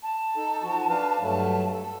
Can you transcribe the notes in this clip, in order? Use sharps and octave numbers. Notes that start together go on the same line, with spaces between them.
A5
D#4 A4
F3 F#4
D4 B4 F5
G2 F#3 A3
A4